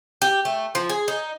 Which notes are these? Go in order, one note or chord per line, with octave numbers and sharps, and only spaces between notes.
G4
A3
F3
G#4
D#4